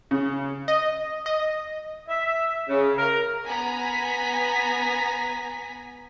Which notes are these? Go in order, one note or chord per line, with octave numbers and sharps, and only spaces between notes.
C#3
D#5
D#5
E5
C#3
A#4
B3 G#5 A#5 B6